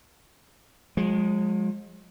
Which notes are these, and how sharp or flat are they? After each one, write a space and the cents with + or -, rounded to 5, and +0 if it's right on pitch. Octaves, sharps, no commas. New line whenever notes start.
F3 +45 G#3 -5